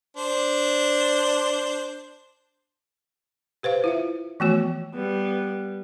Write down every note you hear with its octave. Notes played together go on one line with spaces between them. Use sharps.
D4 C5
G4 B4 C5 F5
E4 F4 E5
E3 F3 A3 B3 F#4 C#5
G3 B3